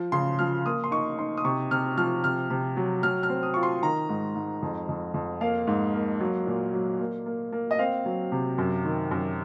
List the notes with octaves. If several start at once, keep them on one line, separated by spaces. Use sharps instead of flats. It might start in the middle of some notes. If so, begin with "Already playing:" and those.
Already playing: F3
C#3 C6
F3 F6
A#3 D#6
C6
D#4 C#6
D#4 C6
D#6
C3 C#6
C3 F6
F3 F6
C3 F6
C3
F#3
F#3 F6
F6
C4
D#6
F4 C#6
C6
D#3 A#5
G#2
G#2
F2
F2
F2
A#3 F5
G#2
A#3
F#3
A#2
F#3
A#3
A#3
A#3
D#5
C4 F5
F#3
C3
F#2
D#3
F#2